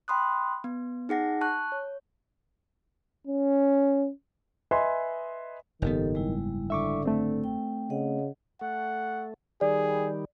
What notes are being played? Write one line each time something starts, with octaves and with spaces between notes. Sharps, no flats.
G5 B5 C6 D#6 F#6
B3
D#4 G#4 F#5 A#6
A5 C#6 F#6
C#5
C#4
B4 D#5 E5 G#5 C6
F#1 G#2 D#3 B3 G4 A4
G3 G#3 E4
D3 E5 C#6 D6
A3 C4
G5
C#3 D#5 F#5
A3 F#5
D#3 G3 G#4 D5